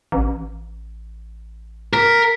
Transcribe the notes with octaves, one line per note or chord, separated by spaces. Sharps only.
A1
A#4 B6